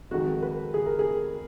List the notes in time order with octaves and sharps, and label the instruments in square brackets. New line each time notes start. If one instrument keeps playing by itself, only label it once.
[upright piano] F2 D#3 G#3 F#4
B4
G#4
A#4
G#4